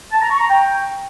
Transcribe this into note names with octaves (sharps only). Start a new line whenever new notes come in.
A5
A#5
C#6
A#5
G5